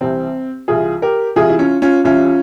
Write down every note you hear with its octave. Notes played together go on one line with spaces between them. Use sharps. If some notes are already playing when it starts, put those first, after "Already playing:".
C2 C3 E3 C4
C2 C3 E3 F4 G#4
G4 A#4
C2 C3 E3 F4 G#4
E4
C#4 F4
C#4 F4
C2 C3 E3 C#4 F4